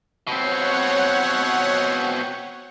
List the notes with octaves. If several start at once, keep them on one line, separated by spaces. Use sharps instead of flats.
B2 C4 C#5 F#5